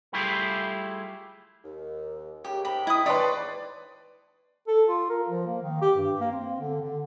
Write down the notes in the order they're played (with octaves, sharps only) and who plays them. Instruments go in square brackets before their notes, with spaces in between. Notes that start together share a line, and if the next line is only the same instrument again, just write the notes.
[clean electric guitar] G3 A3 E4 F4 G4 G#4
[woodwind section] D#2
[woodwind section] D#2 C#3 [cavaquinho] G4
[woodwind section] G#2 G5 [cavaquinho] B5
[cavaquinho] E4 D#6
[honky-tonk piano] B4 D5 [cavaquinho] C#5 C6
[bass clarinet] A4
F4
A#4
F3
A#3
D#3
G4
G2
A#3
C4
D3
D3